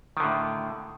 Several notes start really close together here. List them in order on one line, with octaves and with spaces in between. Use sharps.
D#3 D3 A2